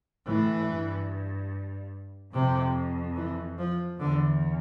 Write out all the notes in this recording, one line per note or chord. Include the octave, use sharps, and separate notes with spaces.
A2 E3
G2
F2 C3
E3
F3
E2 D3